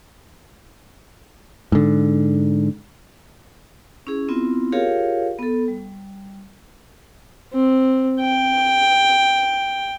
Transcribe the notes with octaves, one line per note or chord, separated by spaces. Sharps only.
G#2 D3
C#4 E4 G#4
B3 C4 E4 F4
F4 G4 G#4 A#4 C#5 F5
B3 A4
G3
C4
G5